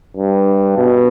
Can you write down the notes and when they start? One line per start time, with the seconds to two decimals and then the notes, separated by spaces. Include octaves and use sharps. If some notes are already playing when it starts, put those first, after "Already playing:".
0.17 G2
0.78 B2